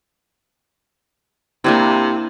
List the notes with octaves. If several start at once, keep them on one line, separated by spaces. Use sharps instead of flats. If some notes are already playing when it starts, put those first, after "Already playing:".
C3 A#3 D4 E4